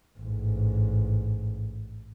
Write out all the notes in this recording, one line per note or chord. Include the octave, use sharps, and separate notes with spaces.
A1 G#2